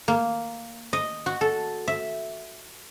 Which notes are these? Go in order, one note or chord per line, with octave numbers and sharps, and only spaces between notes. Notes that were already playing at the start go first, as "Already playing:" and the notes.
A#3
D#5
F#4
A4
E5